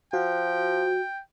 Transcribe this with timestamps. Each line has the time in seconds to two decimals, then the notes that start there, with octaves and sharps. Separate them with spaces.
0.13 F3 F#4 G5